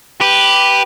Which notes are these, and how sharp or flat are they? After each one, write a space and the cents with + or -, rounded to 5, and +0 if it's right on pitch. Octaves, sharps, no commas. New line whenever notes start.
G4 +0 B4 +0